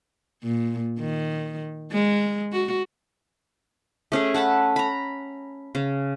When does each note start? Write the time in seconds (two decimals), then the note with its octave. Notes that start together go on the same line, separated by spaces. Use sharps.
0.43 A#2
1.00 D#3
1.92 G#3
2.52 F#4
4.12 A3 C#4 G#4
4.34 A4 F#5 A5 B5
4.76 A#5 B5
5.75 C#3